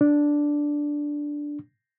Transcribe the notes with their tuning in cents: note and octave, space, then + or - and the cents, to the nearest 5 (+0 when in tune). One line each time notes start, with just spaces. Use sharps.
D4 -5